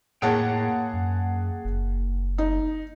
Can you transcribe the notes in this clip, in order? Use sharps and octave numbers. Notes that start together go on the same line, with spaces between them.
A2 A#3 G#4 C#5 F#5 G5 A5
F#2
F#1
D#4